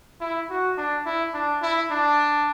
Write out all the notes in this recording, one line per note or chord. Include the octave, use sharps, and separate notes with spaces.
E4
F#4
D4
E4
D4
E4
D4